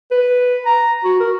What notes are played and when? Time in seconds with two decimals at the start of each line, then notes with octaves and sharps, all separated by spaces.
0.11 B4
0.66 A#5
1.04 F#4
1.20 A#4